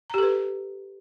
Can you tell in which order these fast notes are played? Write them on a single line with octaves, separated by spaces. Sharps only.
A#5 G4 A4 B4